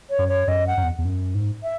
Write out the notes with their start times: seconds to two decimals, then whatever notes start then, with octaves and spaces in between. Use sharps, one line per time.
0.10 C#5
0.18 F#2
0.28 C#5
0.47 F#2 D#5
0.67 F#5
0.77 F#2
0.83 E2
0.98 E2
1.05 F#2
1.35 G#2
1.63 E5